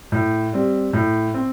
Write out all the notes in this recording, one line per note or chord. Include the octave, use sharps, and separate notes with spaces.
A2
G3 C4
A2
C4